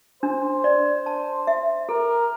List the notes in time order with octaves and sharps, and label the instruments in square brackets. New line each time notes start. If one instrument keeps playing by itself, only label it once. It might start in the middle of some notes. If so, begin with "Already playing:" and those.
[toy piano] D4 [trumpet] C5
[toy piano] D5
A5
E5
[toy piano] A4 [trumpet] A#4